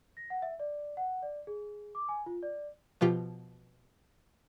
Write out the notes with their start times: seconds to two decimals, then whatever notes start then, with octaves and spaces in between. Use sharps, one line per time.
0.17 A#6
0.30 F#5
0.42 E5
0.60 D5
0.97 F#5
1.23 D5
1.47 G#4
1.95 D6
2.09 G#5
2.26 F4
2.43 D5
3.01 B2 F3 F4 G4